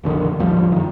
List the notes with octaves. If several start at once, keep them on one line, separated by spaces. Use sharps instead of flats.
F1 A#1 D3 D#3
A1 D#2 F3 G3
F#2 D#3